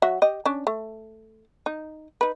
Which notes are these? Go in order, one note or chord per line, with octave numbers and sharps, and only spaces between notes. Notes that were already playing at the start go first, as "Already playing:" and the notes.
F#3 F#4 E5
G4 D#5
C#4 D4
A3
D#4
D#4 B4